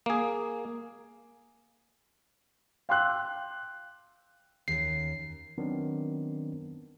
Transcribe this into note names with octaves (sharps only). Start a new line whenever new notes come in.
A#3 G#4
F5 G5 C6 D6 E6 F#6
D#2 C#4 C7
D#3 F#3 B3 C4 D4